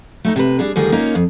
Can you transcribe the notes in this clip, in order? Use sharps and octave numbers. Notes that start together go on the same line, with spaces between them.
A3 C#4 D#4
C3 A4 B4
G3 D4 G#4
D2 D#3 G3 F4 G#4
A#3 C#4 D#4 F4
F2